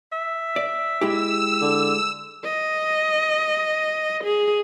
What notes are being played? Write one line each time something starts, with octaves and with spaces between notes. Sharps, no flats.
E5
D5
G#3 E4 G4 E6
D3
D#5
G#4